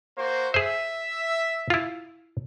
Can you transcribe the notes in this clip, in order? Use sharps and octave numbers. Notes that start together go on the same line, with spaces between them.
A#3 F#4 C5
G#4 C5 E5
E4 F4